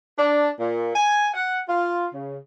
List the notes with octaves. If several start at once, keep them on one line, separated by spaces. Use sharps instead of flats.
D4
A#2
G#5
F#5
F4
C#3